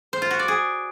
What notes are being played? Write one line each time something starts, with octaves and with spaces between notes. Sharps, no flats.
C5
F4
F#4
D5
G#4